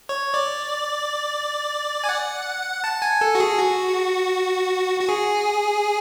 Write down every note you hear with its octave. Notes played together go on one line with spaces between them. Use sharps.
C#5
D5
G#5
F#5
A5
G#5
A4
F#4
G#4
F#4
F#4
G#4